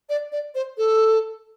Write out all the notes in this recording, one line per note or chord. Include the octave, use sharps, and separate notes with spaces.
D5
D5
C5
A4